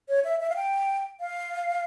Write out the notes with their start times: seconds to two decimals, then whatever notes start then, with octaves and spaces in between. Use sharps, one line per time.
0.09 C#5
0.24 E5
0.40 E5
0.49 F5
0.56 G5
1.20 F5